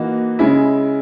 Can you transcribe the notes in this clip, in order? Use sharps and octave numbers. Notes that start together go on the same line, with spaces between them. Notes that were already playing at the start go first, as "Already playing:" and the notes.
Already playing: E3 A#3 D#4 F#4
C#3 G#3 C#4 E4